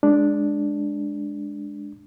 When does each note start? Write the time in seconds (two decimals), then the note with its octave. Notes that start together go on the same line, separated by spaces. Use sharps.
0.03 G#3 D4